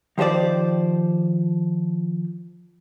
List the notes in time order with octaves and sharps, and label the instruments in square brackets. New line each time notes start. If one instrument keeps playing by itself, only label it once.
[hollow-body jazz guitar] D#3 F3 G4 C5 D5